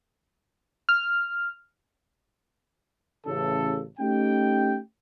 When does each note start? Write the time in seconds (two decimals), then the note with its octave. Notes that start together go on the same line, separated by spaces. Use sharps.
0.89 F6
3.26 A1 C#3 A4
3.99 A3 C#4 D#4 G4 G5